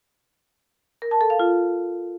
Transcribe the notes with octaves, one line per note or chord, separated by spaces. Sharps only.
A#4
A5
A4
F5
F4